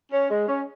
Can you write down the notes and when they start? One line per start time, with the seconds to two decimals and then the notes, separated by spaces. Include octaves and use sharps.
0.12 C#4
0.30 G#3
0.48 C#4